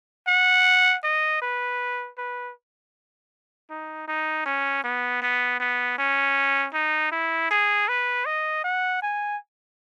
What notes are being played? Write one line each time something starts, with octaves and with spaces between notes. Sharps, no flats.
F#5
D#5
B4
B4
D#4
D#4
C#4
B3
B3
B3
C#4
D#4
E4
G#4
B4
D#5
F#5
G#5